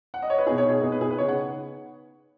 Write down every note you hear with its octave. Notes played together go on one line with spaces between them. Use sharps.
F#5
D#5
C#5
B4
B2 B3 D#4 G#4
C#5
G#4
B2 B3 D#4 G#4
B4
G#4
B4
C#3 B3 D#4 C#5
F#5